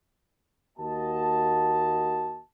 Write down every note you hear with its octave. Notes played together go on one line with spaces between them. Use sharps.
D#2 A#3 F#4 D#5 A5